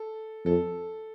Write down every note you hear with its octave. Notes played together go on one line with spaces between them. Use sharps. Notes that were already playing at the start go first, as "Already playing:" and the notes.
Already playing: A4
F2 A4